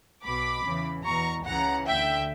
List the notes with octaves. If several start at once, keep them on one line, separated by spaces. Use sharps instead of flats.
B1 B2 B5 D6
E2 C#3 E3
E2 B2 A#5 C#6
C#2 C#3 E3 F#5 A#5
D2 D3 E5 G5